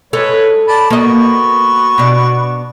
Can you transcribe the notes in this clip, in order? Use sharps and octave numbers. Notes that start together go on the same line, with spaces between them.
G#3 A4 B4 C#5
D5 A5 B5
A#3 B3 F#4 D#5 C#6
B2 D4